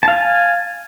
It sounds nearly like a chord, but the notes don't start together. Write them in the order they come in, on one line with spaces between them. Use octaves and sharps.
A5 F5 G#5